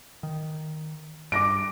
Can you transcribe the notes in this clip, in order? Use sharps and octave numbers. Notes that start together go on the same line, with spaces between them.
D#3
G2 D6 A#6 D7